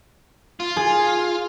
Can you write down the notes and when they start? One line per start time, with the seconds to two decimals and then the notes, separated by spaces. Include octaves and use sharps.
0.60 F4
0.77 G#4